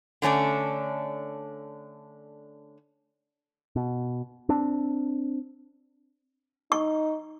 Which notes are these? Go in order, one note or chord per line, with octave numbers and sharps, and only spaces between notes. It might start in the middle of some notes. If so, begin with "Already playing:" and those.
D3 A3 C#4 D4
B2
C4 D4
D#4 C#6